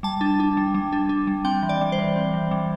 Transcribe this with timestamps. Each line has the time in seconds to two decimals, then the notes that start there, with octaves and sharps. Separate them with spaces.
0.03 G3 A5
0.21 D4
0.40 D4
0.57 G3
0.74 G3
0.92 D4
1.09 D4
1.27 G3
1.45 C4 G5
1.63 E3
1.69 D5
1.81 G3
1.92 C5
1.99 E3
2.16 C4
2.34 E3
2.51 G3